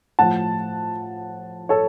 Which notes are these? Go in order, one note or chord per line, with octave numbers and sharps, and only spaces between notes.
A2 F3 F#5 A5
A4 C#5